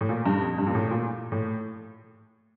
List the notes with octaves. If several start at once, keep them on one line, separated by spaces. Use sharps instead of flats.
A2
A#2
G2
F2
G2
A#2
A2
A#2
A2